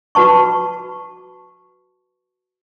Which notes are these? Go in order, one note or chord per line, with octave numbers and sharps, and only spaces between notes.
F#4 B4 A5 C#6